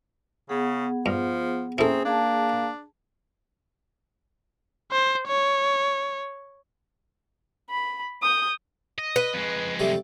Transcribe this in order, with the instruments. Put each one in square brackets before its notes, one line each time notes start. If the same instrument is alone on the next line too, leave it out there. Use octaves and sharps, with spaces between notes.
[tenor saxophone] C#3 [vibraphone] B3 G#4 F#5
[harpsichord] G2 [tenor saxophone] F3
[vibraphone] A#3 C#4 E5 [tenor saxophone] C4 [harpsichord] E4 A4 [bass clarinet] G#4
[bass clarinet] A#3 [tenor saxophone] D4 [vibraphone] G#4 A5
[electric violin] C5
C#5
[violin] B5
D#6 G6
[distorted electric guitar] D#5
[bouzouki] B4
[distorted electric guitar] F2 G#3
[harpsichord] C3 G3 A3